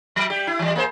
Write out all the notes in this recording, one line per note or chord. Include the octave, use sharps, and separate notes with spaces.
F#3
G3 G4
E4
E3 G3
A#3 G#4 C5